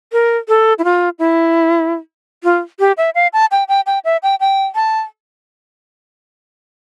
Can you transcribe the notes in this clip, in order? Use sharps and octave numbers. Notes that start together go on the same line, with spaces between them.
A#4
A4
E4
F4
E4
F4
G4
E5
F5
A5
G5
G5
G5
E5
G5
G5
A5